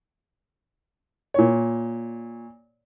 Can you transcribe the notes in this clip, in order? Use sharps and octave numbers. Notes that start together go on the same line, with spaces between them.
A#2 C#5